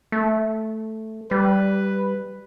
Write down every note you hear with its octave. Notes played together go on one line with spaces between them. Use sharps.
A3
G3 B4